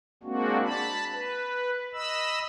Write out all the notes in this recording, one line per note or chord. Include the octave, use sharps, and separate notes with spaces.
G#3 A#3 C4 D4 F#4
A5 B5
B4
D#5 B5 E6